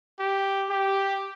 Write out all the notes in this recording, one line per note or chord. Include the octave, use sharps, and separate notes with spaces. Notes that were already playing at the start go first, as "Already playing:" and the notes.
G4
G4